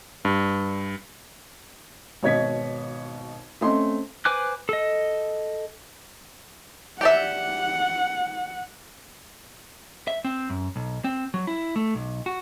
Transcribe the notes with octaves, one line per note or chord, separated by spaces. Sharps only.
G2
G#1 B2 C#5 D#5 G#6 B6
A3 C4 C#4 D#5 C6
B4 C5 G#5 D6 F#6
A4 D#5
G4 D5 E5 F#5
E5
C4
F#2
B1
C4
F#3
E4
A3
B1
F#4